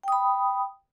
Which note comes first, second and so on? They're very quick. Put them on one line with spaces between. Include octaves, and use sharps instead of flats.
G5 D#6 B5